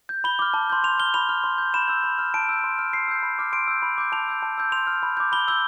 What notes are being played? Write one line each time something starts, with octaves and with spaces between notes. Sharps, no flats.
G6
B5 G7
D6 F6
A5
C6 G6
C6 F7
F6 G7
B5 F7
F6
C6
G6
B5 E7
E6 G6
B5
F6
A5 D7
E6 G6
C6
F6
C6 C7
E6 G6
B5
D6 F6
C6 D7
E6 G6
B5
D6 G6
A5 F7
E6 G6
A5
E6 G6
C6 F7
F6
B5
D6 G6
B5 G7
E6 G6 G7